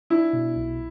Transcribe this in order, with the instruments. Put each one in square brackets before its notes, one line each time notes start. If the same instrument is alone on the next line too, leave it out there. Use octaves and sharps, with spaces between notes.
[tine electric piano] D4 [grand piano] E4
[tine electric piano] B2
B1